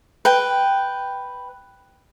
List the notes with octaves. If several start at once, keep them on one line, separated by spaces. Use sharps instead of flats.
B4 G5